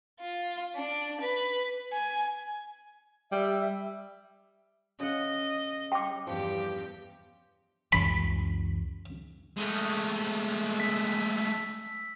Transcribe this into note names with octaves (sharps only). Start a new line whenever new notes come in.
F4
D4
B4
G#5
G3 E5
C#3 D#5 F#5
G5 D6
E2 G2 F3 G4
C#2 F#2 E3 B5
G#3 A3
E6 B6